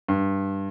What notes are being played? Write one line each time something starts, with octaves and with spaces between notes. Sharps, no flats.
G2